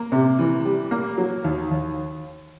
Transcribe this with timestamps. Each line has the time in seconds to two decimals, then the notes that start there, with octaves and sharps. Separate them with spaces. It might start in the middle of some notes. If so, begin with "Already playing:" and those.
Already playing: A#3
0.12 C3
0.39 E3
0.65 G3
0.91 A#3
1.18 F#3
1.44 D#2
1.71 D#2